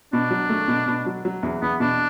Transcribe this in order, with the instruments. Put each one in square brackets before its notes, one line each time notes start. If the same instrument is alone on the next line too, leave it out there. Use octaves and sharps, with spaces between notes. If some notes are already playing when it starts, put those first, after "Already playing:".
[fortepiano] B2 [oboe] D4
[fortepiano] F#3
A3
B2
B2
F#3
F#3
E2
[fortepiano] E2 [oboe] B3
[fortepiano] B2 [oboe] D4